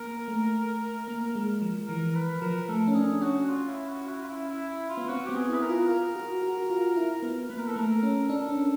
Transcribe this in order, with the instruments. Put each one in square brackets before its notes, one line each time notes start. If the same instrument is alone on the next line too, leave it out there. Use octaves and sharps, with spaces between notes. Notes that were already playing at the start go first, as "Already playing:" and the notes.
Already playing: [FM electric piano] A#3 [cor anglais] A#4
[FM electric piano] A3
A#3
G#3
F3
[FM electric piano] E3 [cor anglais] A#4
[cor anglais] B4
[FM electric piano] F3 [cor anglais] A#4
[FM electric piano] A3 [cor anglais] A4
[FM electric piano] C#4
[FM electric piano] D4 [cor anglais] G#4
[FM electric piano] C#4 [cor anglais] F#4
[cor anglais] F4
E4
F#4
E4
F4
E4
E4
E4
F4
[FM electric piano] B3
[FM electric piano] C4 [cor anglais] F#4
[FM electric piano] B3 [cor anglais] G4
[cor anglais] G#4
[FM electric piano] E4 [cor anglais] B4
[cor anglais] A#4
[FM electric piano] F4
[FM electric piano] F4 [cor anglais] A#4
[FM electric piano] F#4
F#4
F#4
F4
E4
B3
[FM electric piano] A#3 [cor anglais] B4
[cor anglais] A#4
A4
[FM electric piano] A3 [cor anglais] A#4
[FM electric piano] C#4
[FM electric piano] D4 [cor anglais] A4
[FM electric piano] C#4